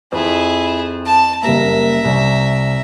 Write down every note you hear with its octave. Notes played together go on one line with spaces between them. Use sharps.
F2 E4 G#4
A5
F#1 G3 A#3 E5 A#5
C2